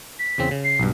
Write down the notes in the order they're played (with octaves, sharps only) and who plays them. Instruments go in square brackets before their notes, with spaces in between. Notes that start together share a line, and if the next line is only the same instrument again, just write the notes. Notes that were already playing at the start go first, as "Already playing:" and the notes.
[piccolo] B6
[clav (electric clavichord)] E2 C#3 C4
C#3
[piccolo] C7
[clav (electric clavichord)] B1 G2